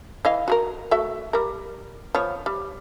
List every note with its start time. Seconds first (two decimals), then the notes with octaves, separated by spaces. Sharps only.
0.25 E3 D#5 F5
0.48 F#4 G#4 A#4
0.91 A3 F#4 E5
1.33 G3 A#4
2.15 F3 B3 C#5
2.46 G3